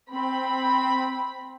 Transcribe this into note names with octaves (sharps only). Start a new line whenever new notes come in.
C4 B5